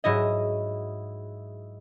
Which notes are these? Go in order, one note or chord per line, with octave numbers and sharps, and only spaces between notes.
G#2 F#3 E4 D#5